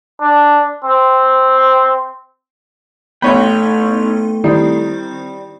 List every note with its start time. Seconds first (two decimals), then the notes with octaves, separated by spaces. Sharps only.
0.21 D4
0.84 C4
3.22 A1 A3 B3 D#4 C#5 G5 B5 C6
4.44 D#3 G3 C4 E4